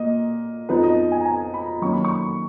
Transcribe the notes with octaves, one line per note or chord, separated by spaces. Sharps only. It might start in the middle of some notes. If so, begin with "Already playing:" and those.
Already playing: A#2 A#3 D#5
F2 F3 B3 D#4 B4
D#5
G#5
A#5
G#5
B5
F#2 D#3 A#3 C#4 C#6
B5
C#6